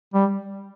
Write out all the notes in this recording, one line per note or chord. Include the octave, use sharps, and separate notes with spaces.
G3